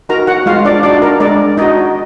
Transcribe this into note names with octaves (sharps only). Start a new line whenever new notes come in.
D#4 F#4 A#4 A#5
F#4 F#5
G#3 F4 F5
D4 D5
D4 D#4 F#4 D5
A#4
G#3 D4 D5
D#4 F#4 D#5